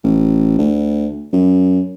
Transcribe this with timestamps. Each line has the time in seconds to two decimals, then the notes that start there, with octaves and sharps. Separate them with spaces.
0.04 A1
0.59 D2
1.33 F#2